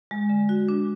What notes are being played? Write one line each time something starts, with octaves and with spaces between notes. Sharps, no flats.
G#3
D3
F#4
D4